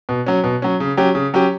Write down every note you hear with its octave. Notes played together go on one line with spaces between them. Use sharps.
B2
F#3 C#4
B2
F#3 C#4
C#3
F#3 C#4 G4
C#3
F#3 C#4 G4